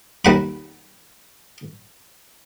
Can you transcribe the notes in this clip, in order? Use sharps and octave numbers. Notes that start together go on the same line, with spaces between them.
D#2 F#5 B5